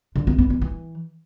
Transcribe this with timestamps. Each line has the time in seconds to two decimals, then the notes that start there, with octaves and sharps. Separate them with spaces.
0.16 D3
0.27 B3
0.39 B3
0.50 E3
0.61 E3